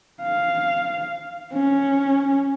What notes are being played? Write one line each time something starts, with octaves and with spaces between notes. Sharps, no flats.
F5
C#4